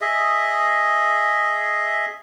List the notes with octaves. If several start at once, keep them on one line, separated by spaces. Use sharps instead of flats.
G#4 D#5 E5